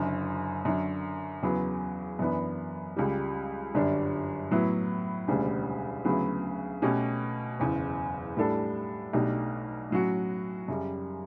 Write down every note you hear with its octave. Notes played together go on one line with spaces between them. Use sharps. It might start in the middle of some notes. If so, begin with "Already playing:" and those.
Already playing: F#1 F#2 D3
F#2 D3 F#3
E2 C#3 F#3 B3
F#2 E3 B3 D4
C#2 C#3 G3
G1 F#2 D3 G3 D4
A2 F#3 B3 E4
E1 D2 C#3 G3 D4
D2 C#3 F#3 B3 E4
B2 A3 C#4 G4
F#1 E2 C#3
A2 G3 D4 A4
B1 B2 A3 D4 G4
A2 F#3 C#4 F#4
F#2 C#3 G3